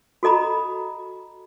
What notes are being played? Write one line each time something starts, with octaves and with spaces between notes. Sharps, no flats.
F#4 A4 D#5 A#5 B5